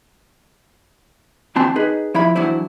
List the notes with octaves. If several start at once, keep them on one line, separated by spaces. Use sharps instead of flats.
D2 E3 C4 A5 C6
D#4 G#4 B4
F3 E4 E5 B5
E3 F#3 D4 E4 C5